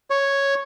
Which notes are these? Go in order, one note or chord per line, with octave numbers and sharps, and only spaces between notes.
C#5